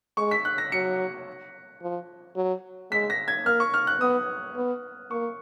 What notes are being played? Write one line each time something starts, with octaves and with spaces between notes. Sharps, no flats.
G#3 C#6
B6
F#6
A#6
F#3 C#7
F3
F#3
G#3 B6
A#6
G#6
A#3 F6
C#6
F6
F#6
B3 D#6
B3
A#3 C#6